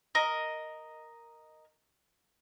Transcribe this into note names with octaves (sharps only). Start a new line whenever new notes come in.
A#4 D#5